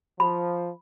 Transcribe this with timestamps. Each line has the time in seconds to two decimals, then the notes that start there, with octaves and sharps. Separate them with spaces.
0.20 F3 B5